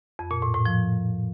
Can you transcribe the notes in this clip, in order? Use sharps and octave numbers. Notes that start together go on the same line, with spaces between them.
F2
A#2
A2
A2
F3